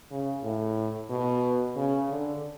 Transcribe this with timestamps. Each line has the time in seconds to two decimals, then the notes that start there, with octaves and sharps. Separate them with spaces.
0.11 C#3
0.43 A2
1.10 B2
1.76 C#3
2.09 D3